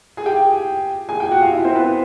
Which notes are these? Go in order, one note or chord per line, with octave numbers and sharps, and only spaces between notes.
G#4 G#5
G4 G5
G#4 G#5
G4 G5
F#4 F#5
F4 F5
E4 E5
C4 C5
B3 B4